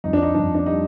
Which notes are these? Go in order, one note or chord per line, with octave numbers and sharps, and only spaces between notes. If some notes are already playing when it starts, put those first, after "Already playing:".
F2 D#4
D4
D#4
F2 D4
D4
G3 D#4